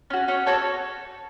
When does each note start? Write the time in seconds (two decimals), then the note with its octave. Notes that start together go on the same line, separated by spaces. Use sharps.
0.10 C#4 F#4
0.28 C#4 C#5
0.46 F#4 A4 C#5